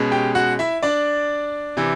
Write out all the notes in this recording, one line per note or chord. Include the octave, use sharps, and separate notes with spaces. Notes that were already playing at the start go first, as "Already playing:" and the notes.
Already playing: B2 G#3 C#4
G4 G5
F#4 F#5
E4 E5
D4 D5
C3 E3